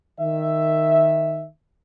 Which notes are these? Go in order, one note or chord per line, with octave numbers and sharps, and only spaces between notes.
D#3 E5